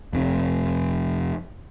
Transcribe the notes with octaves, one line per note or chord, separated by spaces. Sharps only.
F1 F2